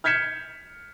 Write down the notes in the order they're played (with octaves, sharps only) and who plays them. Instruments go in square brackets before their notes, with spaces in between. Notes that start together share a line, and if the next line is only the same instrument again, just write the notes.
[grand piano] F6 G6 G#6 B6 C#7 E7